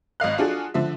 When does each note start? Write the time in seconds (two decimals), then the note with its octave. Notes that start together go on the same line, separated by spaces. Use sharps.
0.20 G#1 D#5 F5 F#6
0.38 D4 F4 F#4 G#4 A4
0.74 D3 F3 E5